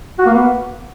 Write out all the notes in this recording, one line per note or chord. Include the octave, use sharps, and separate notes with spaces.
F#4
A#3
B3